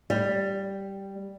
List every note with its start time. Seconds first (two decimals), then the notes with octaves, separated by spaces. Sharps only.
0.10 G3